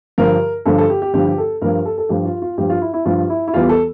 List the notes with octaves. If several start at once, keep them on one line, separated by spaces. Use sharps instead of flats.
G2 D3 F3 A#4
G2 D3 F3 A4
A4
G4
G4
G2 D3 F3 G4
G4
A4
G2 F3 A#4
A4
A4
G2 F3 G4
F4
F4
G2 F3 G4
F4
E4
E4
G2 F3 F4
E4
E4
E2 E3 G3 F4
A4